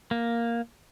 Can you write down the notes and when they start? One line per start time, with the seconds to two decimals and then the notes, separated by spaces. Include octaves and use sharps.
0.11 A#3